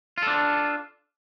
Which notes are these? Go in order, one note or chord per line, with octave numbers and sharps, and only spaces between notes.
D4 F4 A4